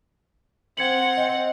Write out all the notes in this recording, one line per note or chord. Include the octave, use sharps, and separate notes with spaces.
C4 F#5 G#6 C#7 F#7
D#5